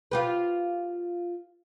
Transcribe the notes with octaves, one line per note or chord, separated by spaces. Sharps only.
F4 G4 B4